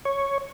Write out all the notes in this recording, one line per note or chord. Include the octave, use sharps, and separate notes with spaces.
C#5